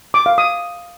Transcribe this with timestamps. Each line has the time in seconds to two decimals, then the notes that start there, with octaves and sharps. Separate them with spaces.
0.14 D6
0.26 F5
0.38 D#6